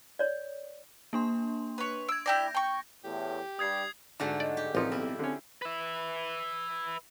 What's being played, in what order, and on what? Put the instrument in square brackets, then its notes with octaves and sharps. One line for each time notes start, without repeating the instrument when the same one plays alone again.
[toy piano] C#5 D5
[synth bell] A#3 D4 C6
[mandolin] B4 C#5
[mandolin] E6 [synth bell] G#6 D7
[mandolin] E4 G4 D5 [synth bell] G6 A#6
[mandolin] G5 C#6
[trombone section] E2 A2 [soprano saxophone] G4
[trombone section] G2 G3 [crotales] D#6 G#6 C7
[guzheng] G#2 D3 A3 [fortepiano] D4 F#4
[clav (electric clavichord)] D5 [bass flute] D#5
[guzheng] G4
[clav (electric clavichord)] A1 F3 [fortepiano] A#3 D#4 C#5 [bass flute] C4 [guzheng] F4 G4
[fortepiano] B1 [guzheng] E4
[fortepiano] D3 C#4 [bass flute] C4
[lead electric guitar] B4 E5